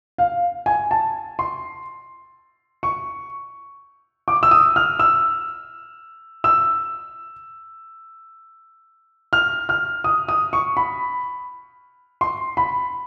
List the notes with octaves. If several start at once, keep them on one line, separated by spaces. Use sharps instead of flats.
F5
G#5
A5
C6
C#6
D6
E6
D#6
F6
E6
E6
F6
F6
D#6
D#6
C#6
B5
C6
B5